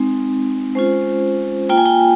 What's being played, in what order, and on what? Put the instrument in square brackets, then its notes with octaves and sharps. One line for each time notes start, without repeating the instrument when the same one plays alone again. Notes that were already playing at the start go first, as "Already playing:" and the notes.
Already playing: [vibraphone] G#3 C4 D#4
G#3 C#4 F4 C5
A#3 F4 G5
G#5
G5